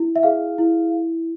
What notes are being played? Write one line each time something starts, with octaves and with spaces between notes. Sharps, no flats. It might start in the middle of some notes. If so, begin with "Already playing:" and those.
Already playing: E4
E5
G#4 F5
E4